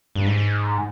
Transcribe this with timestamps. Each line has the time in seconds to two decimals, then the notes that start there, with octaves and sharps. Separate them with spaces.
0.15 G2
0.26 G#2
0.37 G#2